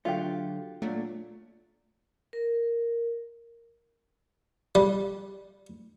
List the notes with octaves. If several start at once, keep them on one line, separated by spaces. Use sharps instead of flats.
D3 F#3 A3 F4 G4
A#2 F#3 A3 D4
A#4
G3